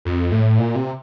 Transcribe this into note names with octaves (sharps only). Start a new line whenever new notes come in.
F2
A2
A#2
C3